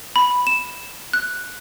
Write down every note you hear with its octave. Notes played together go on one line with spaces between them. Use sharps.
B5
E7
F#6